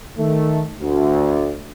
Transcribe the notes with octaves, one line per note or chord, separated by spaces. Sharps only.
D#3 A3
D2